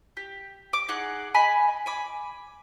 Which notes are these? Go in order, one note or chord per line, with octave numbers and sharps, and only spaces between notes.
G4
D6
D#4 G#4 F#5
D#5 G#5 B5
G#5 B5 D6